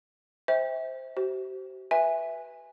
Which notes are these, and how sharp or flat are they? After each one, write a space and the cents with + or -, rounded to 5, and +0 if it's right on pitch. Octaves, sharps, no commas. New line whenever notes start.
C5 +0 E5 -30 G5 +35
G4 -45 C5 +0
B4 +0 E5 +0 G#5 -15